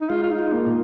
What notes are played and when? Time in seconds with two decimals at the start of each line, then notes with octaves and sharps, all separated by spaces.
0.01 D#4
0.10 G#3 F4
0.24 F4
0.31 D#4
0.39 F4
0.53 A#3
0.67 A#2